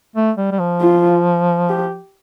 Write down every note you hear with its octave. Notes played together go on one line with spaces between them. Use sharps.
A3
G3
G3
F3
F4
G4